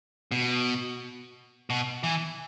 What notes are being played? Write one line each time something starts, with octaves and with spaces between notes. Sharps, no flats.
B2
B2
E3